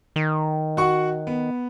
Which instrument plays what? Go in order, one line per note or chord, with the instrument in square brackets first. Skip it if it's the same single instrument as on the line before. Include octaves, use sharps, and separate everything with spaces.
[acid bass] D#3
[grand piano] F#4 F#5 C#6
B3